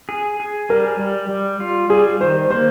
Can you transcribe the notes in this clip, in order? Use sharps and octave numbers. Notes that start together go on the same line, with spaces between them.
G#4
G#4
G3 A#4
G3
G3
F4
G3 G#4
D#3 C5
A#3 C5